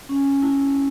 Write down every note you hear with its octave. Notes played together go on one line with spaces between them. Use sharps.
C#4
E4